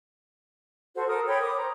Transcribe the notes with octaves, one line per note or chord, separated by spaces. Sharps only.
F#4 A4 C5
A4 A#4 D#6
C#5 G5 B5
D6 D#6
C5 A#5